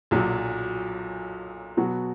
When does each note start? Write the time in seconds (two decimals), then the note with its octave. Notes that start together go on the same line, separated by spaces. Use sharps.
0.11 B1 A#2 F#3
1.77 B2 F#3 B3 F#4